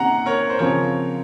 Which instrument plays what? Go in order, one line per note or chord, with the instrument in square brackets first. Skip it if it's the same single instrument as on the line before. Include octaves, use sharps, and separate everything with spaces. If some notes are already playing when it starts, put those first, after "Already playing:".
Already playing: [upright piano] C3 D#3 A#3 C#4 F#5 A#5
A#4 C#5
C5
C#3 F3 C4 A#4 C#5